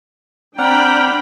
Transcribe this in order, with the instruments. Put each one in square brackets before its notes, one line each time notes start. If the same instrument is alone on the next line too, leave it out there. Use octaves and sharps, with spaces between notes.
[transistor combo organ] C4 D5 F6 [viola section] D4 G5 B5 [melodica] F#5 [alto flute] A#5